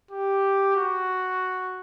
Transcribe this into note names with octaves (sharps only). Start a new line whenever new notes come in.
G4
F#4